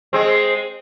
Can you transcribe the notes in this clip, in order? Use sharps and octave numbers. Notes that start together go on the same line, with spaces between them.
G#3 C4